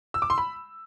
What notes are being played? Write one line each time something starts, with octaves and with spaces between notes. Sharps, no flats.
E6
D6
C6
B5